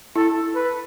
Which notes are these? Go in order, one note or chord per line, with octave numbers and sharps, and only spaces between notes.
E4 A4
B4